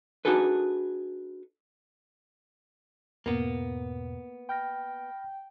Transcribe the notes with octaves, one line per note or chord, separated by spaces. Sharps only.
D4 D#4 F#4 G#4 A4 B4
E2 G#2 B2 A#3 B3
G5 B5 F6 A#6